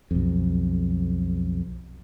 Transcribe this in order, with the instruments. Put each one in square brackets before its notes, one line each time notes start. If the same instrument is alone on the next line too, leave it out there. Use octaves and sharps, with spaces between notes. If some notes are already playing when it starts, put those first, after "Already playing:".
[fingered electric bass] B1 F2